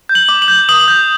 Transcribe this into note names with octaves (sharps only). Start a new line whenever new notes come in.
G6
F#7
D6
F#7
G6
D#6 F#7
G6